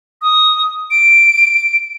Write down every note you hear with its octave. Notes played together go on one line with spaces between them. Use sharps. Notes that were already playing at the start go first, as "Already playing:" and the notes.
D#6
D7